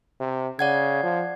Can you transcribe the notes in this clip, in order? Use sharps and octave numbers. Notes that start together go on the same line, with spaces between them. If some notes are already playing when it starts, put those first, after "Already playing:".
C3
C#3 D5 F#5 G#6
F3